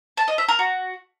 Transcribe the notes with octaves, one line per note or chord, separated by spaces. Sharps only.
A5
D#5
E5
A#4
F#4